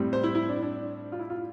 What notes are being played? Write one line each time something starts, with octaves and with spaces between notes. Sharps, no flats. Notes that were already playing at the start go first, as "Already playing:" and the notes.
Already playing: A2 G3 C4
C5
E4
E4
D4
D4
F4
E4
F4